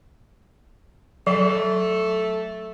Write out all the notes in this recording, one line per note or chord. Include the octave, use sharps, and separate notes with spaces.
F#3 A3